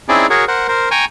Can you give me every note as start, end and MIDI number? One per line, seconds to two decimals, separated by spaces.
0.09 0.26 60
0.09 0.26 61
0.09 0.26 63
0.09 0.26 64
0.09 0.26 68
0.09 0.26 74
0.30 0.45 66
0.30 0.45 68
0.30 0.45 70
0.30 0.45 73
0.48 0.67 70
0.48 0.67 72
0.48 0.67 78
0.68 0.89 70
0.68 0.89 72
0.91 1.05 79
0.91 1.05 80
0.91 1.05 82
0.91 1.05 85